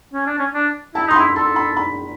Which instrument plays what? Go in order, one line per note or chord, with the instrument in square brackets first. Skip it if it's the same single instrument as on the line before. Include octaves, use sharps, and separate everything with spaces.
[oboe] C#4
D4
C#4
D4
[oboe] E4 [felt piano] A5
[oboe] D#4 [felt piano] C6
[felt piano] B5
[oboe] E4
[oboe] A4 [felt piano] C6
[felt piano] B5
B5